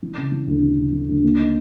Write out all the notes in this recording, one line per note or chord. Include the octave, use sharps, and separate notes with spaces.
E3
C#3
E3
D2
E3
C#3
E3
D2
A#3
D#4